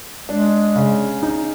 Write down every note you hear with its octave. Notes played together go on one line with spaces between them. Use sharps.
G#3 D4
C#3
D#4